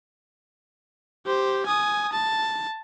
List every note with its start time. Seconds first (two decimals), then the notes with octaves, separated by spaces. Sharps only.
1.26 G4 C5
1.66 G#5 D#6
2.12 A5